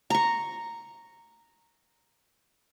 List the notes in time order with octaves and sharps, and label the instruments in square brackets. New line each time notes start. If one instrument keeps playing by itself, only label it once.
[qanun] A#5 C#6